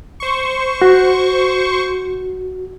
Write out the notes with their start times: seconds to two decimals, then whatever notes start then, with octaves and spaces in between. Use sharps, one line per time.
0.20 C5 C#6
0.82 F#4